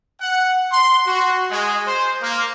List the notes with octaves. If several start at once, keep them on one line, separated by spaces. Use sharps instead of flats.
F#5
C6
F#4
G#3
C5
A#3